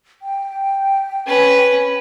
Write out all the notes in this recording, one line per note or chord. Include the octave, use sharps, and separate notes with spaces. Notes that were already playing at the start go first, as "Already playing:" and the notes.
G5
C#4 B4